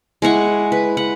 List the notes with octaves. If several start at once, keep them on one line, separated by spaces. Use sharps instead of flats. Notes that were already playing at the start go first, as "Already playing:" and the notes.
G#3 E4 F#5 C#6
B4
F#5